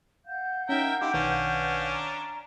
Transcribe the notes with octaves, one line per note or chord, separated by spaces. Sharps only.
F5 F#5 G6
C#4 D#4 A#4 E5 G5
D#4 E4 G4 C6 D6
B1 D#3 C#4 D4 B4
A#5